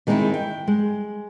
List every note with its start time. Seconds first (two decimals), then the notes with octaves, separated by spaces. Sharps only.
0.07 D#3 G#3 C4 C#4 D#4 E4
0.34 G5
0.68 G#3